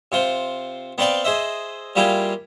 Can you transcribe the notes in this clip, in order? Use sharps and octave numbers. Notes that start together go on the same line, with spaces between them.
C3 F4 C5
B3 C4 B4 D5 F5 G5
G#4 C5 D#5 E5
G3 A#3 E4 F4 G4 G#4